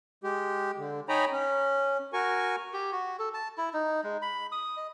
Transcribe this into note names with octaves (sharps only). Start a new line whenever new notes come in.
G#3 G4
D3
D#4 C#5 G5 G#5 A#5 B5
C#4
F#4 A#4 G#5 C#6
G4
F#4
A4
A5
E4
D#4
G#3
B5
D#6
D#5